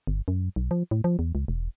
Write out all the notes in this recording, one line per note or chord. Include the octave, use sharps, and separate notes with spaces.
G1
F#2
B1
F3
A2
F3
E2
C#2
E1